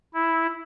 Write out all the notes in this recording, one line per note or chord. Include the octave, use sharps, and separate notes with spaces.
E4